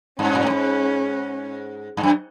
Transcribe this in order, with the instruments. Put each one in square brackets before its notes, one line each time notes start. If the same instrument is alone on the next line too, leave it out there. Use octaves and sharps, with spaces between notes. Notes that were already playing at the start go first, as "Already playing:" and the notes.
[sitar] G2 [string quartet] C#4
[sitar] A#2
A2
G#2
G2
F#2